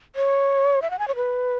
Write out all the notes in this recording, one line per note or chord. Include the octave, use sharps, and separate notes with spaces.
C#5
E5
F#5
G#5
C#5
B4